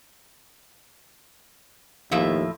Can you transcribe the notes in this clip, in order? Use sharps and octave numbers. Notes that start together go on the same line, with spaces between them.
D#2 A2 F3 E5